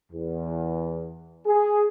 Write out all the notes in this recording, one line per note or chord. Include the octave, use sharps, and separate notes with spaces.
E2
G#4